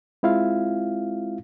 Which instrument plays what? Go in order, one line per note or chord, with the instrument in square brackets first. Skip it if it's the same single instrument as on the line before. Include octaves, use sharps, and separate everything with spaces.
[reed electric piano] G#3 C4 E4 F4 F5